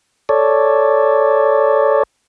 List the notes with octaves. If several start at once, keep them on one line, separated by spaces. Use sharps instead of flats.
A4 C#5 D5